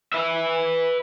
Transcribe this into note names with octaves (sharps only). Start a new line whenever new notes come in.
B4 E5